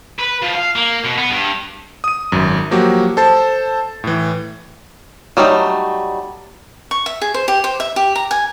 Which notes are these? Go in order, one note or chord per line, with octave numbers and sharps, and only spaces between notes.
B4
F3
F5
A#3
B2
B3
G2
D#6 D#7
G#1 F#2
F3 F#3 A#3 F#4 G4
A4 C5 A5 A6
A2 E3
F#3 G3 A3 D#4
C#6
E5
G#4
C5
G4
C5
E5
G4
A#5
G#5